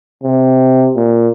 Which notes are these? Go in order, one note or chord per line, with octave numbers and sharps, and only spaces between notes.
C3
A#2